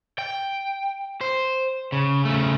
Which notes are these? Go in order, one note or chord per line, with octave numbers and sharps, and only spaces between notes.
G5
C5
C#3
C#3 A3